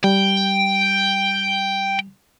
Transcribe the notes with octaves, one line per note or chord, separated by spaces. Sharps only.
G3 G5